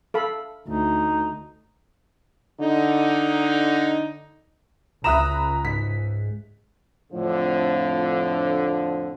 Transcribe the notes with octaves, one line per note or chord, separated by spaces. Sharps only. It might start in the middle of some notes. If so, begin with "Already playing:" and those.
A4 F5 B5
D2 D#4
D3 D#4
C#2 E5 A#5 B5 D#6 F#6 E7
G#2 B6
F2 A2 D3 F3